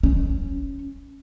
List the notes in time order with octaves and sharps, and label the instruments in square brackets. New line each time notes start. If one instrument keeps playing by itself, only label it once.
[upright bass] C#4